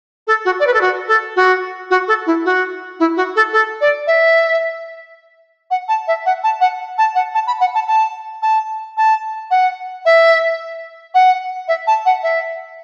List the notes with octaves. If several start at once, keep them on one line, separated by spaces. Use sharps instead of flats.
A4
F#4
D5
B4
A4
F#4
A4
F#4
F#4
A4
E4
F#4
E4
F#4
A4
A4
D5
E5
F#5
A5
E5
F#5
A5
F#5
A5
F#5
A5
B5
F#5
A5
A5
A5
A5
F#5
E5
F#5
E5
A5
F#5
E5